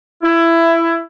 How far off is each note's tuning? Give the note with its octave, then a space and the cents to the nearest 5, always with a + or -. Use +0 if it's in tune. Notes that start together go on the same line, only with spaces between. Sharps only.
E4 +15